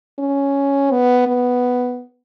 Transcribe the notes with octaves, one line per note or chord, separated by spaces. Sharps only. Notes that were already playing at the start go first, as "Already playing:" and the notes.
C#4
B3
B3